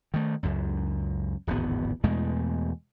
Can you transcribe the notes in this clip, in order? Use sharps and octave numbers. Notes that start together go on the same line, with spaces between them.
D#3 A3
C#2 F#2
D1 G#1 E2 B3
E2 B2 G#3 A3